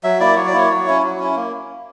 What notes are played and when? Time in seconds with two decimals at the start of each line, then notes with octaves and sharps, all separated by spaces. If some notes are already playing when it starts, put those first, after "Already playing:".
0.04 F#3 E5
0.20 A#3 E4 D5
0.36 F#3 C#5
0.47 D5
0.53 A#3 E4 C#5
0.69 F#3
0.86 C#4 E4
1.03 F#3
1.19 C#4 E4
1.36 A#3